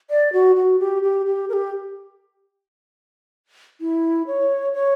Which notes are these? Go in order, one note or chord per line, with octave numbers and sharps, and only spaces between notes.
D5
F#4
F#4
G4
G4
G4
A#4
G4
E4
C#5
C#5